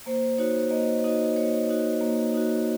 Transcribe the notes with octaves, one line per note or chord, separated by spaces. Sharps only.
A#3 C5
D#4 F#4 C#5
A#3 D#5
D#4 F#4 D#5
A#3 C#5
D#4 F#4
A#3
D#4 F#4